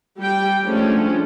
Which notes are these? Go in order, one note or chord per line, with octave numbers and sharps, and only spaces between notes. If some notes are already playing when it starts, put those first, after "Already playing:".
G3 G4 G5
F3 G#3 A3 C#4 D4